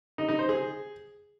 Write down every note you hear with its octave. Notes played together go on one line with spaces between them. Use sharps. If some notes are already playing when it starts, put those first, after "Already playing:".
D#4
D#4
C5
G#4